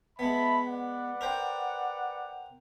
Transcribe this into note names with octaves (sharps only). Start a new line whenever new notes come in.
G#3 B3 E5 A5 B5
B4 D5 F#5
A#4 C5 G5